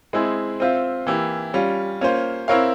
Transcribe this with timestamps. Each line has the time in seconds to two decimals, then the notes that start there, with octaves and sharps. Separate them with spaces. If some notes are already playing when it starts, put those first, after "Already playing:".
0.13 G#3 C4 E4 G#4
0.60 C4 F4 C5 E5
1.07 E3 A#3 E4 G4
1.54 G3 C#4 F4
2.01 A#3 C#4 F4 C5
2.48 C4 E4 A#4 C#5 F5